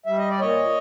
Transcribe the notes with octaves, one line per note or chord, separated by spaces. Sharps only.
G3 E5
D#5
D5
A#2 C#5 D#5